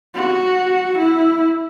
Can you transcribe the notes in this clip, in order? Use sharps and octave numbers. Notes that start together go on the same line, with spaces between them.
F#4
E4